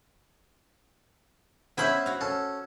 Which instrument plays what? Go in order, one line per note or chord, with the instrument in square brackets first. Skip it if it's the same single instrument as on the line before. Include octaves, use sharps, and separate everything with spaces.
[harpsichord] B3 C#4 E5 [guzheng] E4 C5 B5
[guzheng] F#4 F5
[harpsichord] C#4 A4